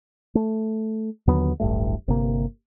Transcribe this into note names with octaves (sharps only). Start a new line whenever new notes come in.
A3
D#2 D3 F#3 B3
D1 A1 G2 A3
G1 C3 A#3